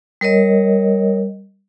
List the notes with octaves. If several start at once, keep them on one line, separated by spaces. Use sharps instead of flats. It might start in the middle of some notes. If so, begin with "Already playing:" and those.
G3 A#4 C#5 D#5